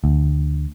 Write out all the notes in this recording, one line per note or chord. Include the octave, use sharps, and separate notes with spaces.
D2